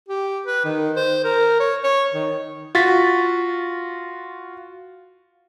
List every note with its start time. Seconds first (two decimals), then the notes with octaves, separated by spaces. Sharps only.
0.08 G4
0.46 B4
0.65 D#3
0.96 C5
1.24 A#4
1.60 C#5
1.84 C#5
2.14 D#3
2.75 F4 F#4 A6 B6